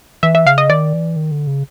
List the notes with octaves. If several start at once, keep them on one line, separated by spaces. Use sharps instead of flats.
E3 E5
E5
C#3 F5
D#5
D#3 D5
E3
D#3
D3
C#3